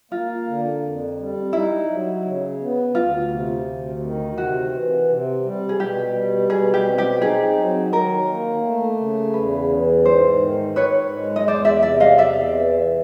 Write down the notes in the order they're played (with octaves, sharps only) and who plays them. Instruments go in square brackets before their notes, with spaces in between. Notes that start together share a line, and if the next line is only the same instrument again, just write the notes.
[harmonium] A#3 [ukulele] F4
[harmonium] D3
F2
G3
[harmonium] D#4 [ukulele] E4
[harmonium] F#3
C#3
B3
[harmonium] D2 [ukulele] F4
[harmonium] C3
D2
D#3
[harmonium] C3 [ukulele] F#4
[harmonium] E3
C3
G3
[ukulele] G#4
[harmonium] B2 [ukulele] G4
[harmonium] G3
[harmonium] B2 [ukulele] G#4
[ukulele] G4
[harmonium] C4
[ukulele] G4
[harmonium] D#4 [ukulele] G#4
[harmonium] F#3
[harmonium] D#3 [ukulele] A#4
[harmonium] A#3
A3
C#3
[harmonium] E2 [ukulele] B4
[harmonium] E3
[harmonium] G#2 [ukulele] C5
[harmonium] D#3
[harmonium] G#2 [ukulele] B4 C#5
[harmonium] G#3
[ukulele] D#5
[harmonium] E2 [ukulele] C5 D5
[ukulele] D5 E5
[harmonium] C3 [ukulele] D5 E5
[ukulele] D#5 F5
[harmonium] E2 [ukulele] D5 E5
[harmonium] E3